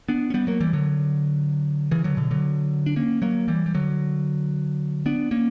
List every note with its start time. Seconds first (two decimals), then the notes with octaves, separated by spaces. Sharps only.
0.09 B3 D4
0.30 C#4
0.34 G3 B3
0.47 F#3 A#3
0.61 E3 G3
0.73 D3 F#3
1.91 C#3 E3
2.04 D3 F#3
2.17 B2 D3
2.31 D3 F#3
2.86 D4
2.96 A#3 C#4
3.22 F#3 A#3
3.48 E3 G3
3.66 G3
3.75 D3 F#3
5.06 B3 D4
5.31 A#3 C#4